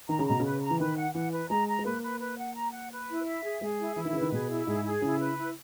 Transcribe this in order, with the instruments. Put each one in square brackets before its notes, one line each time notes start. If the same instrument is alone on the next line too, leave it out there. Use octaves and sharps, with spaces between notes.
[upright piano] D#3 [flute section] A#5
[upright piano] C#3
[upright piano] B2 [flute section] A#5
[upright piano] C#3 [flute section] B4
[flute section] A#5
[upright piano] E3
[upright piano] D#3 [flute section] B4
[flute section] F#5
[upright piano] E3 [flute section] F#5
[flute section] B4
[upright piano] G#3 [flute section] A#5
[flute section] A#5
[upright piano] G#3
[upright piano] A#3 [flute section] B4
[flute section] B4
B4
F#5
A#5
F#5
B4
E4
E5
G#4
[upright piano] G#3 [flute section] G#4
[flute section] E4
[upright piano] E3 [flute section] E4
[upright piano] D#3
[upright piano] C#3 [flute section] B4
[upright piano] D#3
[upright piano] B2 [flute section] G#4
[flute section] E4
[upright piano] G#2 [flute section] G#4
[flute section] G#4
[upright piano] C#3 [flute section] E4
[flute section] B4
E4